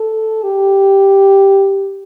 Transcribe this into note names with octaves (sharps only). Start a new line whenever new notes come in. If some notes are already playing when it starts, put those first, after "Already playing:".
Already playing: A4
G4